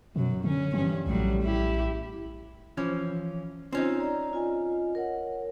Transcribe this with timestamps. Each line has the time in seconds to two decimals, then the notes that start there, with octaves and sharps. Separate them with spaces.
0.16 F#2 B2 F#3
0.44 D3 C#4
0.74 G2 E3 C#4
1.07 A#1 A2 F#3 G3
1.42 E4 G4
2.77 E3 F3 C#4
3.73 C4 C#4 D#4 F4 G#5
3.99 D5 A#5
4.33 F4 D#5 G#5
4.95 A#4 C#5 F#5